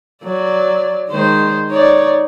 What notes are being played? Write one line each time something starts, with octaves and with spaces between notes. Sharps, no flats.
F#3 D5
D#3 G#3 C5
D#4 C#5 D5